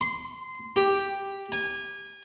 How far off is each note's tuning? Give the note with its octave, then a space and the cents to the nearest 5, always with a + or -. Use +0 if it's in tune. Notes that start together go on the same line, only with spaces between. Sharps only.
C6 -20
G4 +5
G#5 -25